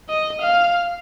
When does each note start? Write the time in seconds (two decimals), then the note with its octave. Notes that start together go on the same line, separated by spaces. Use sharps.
0.09 D#5
0.41 F5